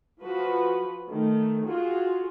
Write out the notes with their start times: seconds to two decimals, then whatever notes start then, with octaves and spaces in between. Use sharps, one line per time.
0.21 F3 F#4 B4
1.09 D#3 A3
1.66 F4 F#4 G#4